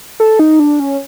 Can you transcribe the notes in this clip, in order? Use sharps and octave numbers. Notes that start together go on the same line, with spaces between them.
A4
D#4
D4
C#4